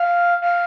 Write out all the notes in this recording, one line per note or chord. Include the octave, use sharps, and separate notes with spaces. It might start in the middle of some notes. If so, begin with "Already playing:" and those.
Already playing: F5
F5